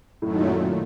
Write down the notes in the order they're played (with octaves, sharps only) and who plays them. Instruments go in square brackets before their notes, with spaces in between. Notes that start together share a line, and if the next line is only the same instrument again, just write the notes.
[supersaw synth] F#2 D#3 F#3 A3 [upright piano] A2
[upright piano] A#2